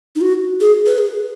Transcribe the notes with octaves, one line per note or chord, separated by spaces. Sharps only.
D#4
F#4
G#4
B4
G#4